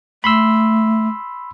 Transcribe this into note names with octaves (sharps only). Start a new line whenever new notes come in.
A3 B5 C6 E6